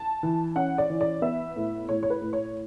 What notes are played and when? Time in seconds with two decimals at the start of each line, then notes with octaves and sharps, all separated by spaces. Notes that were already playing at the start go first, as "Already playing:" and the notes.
Already playing: A5
0.23 E3
0.56 C#4 F#5
0.78 D5
0.90 E3
1.01 D5
1.22 B3 E5
1.56 A2
1.89 A2 C#5
2.03 C#5
2.10 B4
2.21 A2
2.33 C#5